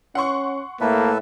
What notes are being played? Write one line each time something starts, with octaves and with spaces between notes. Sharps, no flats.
C#4 F#5 C6 C#6
A2 A#3 A4 B4 E5